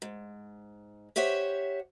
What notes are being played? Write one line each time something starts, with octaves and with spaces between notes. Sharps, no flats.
G#2
G4 C5 C#5 E5 F#5